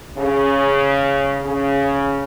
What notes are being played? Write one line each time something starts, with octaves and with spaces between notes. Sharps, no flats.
C#3
C#3